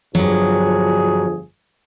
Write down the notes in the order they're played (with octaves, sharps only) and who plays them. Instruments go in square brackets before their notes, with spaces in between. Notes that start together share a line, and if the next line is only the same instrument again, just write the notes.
[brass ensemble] G1 F3 G#4 [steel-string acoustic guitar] G2 F#3